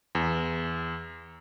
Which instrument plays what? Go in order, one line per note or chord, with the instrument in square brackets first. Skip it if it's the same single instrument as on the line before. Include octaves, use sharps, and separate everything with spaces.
[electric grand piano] E2